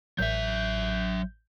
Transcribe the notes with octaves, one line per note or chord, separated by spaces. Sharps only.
A1 F#3 E5 G6